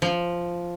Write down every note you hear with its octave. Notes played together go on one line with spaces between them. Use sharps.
F3